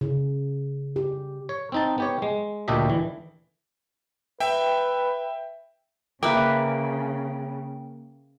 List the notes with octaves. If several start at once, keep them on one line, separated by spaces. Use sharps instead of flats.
C#3
G4
C#5
C4 D#4 A5
B3 G4 C#5
G#3
D2 A#2 D4 G4 D#5 E5
E3
B4 E5 G5
C#3 A#3 B4 E5 G5 A#5 D6